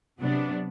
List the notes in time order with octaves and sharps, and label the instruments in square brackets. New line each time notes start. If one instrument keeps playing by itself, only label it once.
[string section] C3 F#3 B3 D4